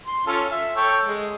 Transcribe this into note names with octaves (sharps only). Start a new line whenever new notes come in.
C6
C#4 F4 A4
E5
A4 C#5 G5
G#3